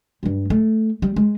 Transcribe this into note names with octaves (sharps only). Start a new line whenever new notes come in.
G2 G3
A3
G3
G#3